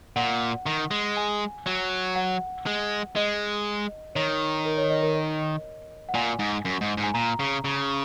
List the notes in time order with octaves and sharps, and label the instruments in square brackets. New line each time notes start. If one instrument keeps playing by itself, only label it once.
[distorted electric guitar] A#2 [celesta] F#5
[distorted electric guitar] D#3
G#3
[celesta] G#5
[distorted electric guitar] F#3
[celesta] F#5
[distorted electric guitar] G#3
[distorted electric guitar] G#3 [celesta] D#5
[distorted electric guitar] D#3 [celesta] C#5
[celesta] A#4
C#5
D#5
A#4
D#5
F#5
[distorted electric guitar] A#2 [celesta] G#5
[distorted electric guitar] G#2
F#2
G#2
G#2
[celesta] G#5
[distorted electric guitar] A#2 [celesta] A#5
[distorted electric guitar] C#3
C#3